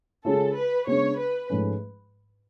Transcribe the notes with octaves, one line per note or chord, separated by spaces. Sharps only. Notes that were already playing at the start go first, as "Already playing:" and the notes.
C#3 G#3 C#4 F4 A4
B4
C#3 G#3 B3 D4 C#5
B4
G#2 F3 A3 C#4